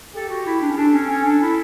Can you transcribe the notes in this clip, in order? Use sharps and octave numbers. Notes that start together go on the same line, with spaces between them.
G4 A4
F#4
E4
D4
C#4
D4 A4
C#4
C#4
D4
E4